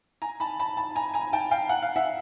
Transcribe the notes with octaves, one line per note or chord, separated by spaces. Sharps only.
G#5 A#5
A5 B5
A5 B5
A5 B5
G#5 A#5
G#5 A#5
G5 A5
F5 G5
F#5
F5
E5 F#5